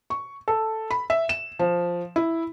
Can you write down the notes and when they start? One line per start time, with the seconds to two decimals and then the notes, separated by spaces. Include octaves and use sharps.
0.10 C#6
0.48 A4
0.91 B5
1.10 E5
1.29 E7
1.59 F3
2.16 E4